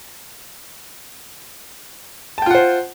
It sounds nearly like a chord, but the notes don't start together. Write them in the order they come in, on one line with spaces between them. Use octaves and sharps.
A5 G5 F4 F#5 C5